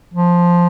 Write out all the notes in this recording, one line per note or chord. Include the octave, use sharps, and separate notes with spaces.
F3